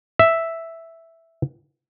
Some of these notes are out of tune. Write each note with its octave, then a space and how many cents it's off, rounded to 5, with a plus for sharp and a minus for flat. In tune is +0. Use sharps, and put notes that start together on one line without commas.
E5 +0